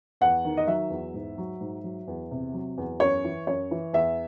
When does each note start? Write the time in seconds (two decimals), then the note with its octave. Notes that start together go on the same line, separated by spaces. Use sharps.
0.21 E2 F#5
0.45 D#3
0.57 D#5
0.67 F#3 E5
0.90 E2
1.14 G#2
1.38 F#3
1.60 G#2
1.84 F#3
2.07 E2
2.31 C3
2.54 F#3
2.78 E2
3.00 F#2 C#5
3.25 E3
3.47 F#2 C#5
3.71 E3
3.93 E2 E5